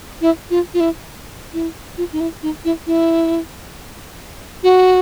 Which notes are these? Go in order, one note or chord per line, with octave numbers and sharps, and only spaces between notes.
E4
F4
F4
E4
E4
F4
D#4
E4
D#4
E4
E4
F#4